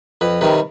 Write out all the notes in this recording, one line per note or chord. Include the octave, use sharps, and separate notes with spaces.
F2 B4
C3 D#3 G3 B4